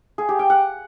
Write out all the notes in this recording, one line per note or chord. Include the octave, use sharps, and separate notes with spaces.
G#4
G4
G5
F#5